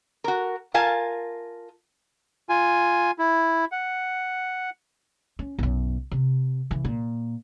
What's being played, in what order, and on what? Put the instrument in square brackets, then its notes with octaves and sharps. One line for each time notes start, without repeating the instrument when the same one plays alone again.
[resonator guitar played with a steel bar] F#4 A#4
F4 A#4 F5 G#5 A5
[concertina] F4 G#5
E4
F#5
[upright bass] C#4
B1 F#2
C3
C#3 E3
A#2